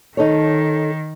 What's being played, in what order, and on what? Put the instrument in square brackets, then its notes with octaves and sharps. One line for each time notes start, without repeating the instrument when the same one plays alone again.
[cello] D#3 [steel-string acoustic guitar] D#4 A4 C#5